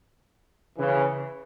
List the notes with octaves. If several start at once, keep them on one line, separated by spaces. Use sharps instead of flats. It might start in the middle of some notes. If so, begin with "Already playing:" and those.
C#3 E3